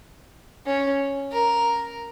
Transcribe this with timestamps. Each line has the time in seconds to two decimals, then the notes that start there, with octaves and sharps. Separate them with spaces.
0.66 C#4
1.32 A#4